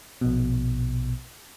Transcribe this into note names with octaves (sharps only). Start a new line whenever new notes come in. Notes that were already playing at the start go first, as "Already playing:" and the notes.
A#1 B2